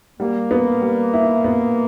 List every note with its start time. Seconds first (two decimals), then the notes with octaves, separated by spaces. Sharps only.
0.19 G3 A#3
0.51 B3
0.81 G3
1.13 E4
1.44 B3